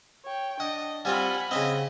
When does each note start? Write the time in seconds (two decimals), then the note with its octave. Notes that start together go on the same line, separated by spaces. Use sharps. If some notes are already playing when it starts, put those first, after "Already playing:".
0.25 C#5 G5
0.60 D4 D#5 F#5
1.05 G3 C4 F4 F#5 G#5 B5
1.51 C#3 C4 D#5